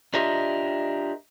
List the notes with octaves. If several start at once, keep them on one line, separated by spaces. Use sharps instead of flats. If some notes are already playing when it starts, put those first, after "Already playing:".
D4 F4 G4 A#4 D#5 E5